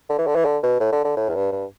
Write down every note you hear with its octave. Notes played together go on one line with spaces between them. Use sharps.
D3
E3
D3
E3
D3
B2
A2
D3
D3
A2
E2
G2
G2